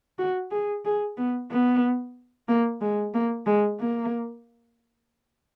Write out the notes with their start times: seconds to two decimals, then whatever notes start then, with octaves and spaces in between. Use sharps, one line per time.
0.19 F#4
0.51 G#4
0.85 G#4
1.17 B3
1.50 B3
2.48 A#3
2.81 G#3
3.14 A#3
3.46 G#3
3.80 A#3